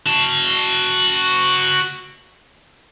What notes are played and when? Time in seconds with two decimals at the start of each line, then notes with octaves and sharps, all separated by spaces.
0.07 F#4 A5